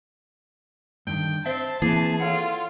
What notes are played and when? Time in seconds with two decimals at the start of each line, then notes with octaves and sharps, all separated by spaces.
1.07 G2 D3 D#3 G5
1.46 C4 C5 E5 A5
1.82 E3 A#3 C4 G#4
2.20 F4 A4 C#5 F#5